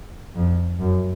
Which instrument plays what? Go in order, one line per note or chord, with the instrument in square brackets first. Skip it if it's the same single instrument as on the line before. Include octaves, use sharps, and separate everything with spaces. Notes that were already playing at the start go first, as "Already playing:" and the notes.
[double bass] F2
F#2